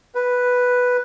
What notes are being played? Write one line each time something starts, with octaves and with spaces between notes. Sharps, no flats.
B4